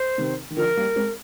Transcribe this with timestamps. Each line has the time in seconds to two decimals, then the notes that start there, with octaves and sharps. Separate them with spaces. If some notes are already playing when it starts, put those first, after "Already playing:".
Already playing: C5
0.18 C3 D#3
0.50 D#3
0.57 D3 F3 A#4
0.77 G3 A#3
0.96 G#3 C4